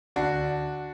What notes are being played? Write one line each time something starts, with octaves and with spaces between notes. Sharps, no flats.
D2 D4 F#4